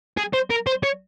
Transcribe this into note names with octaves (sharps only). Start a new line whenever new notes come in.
G#4
C5
A#4
C5
C#5